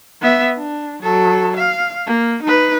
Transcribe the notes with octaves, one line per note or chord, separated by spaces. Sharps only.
B3 E5
D4
F#3 A4
F5
A#3
D#4 B4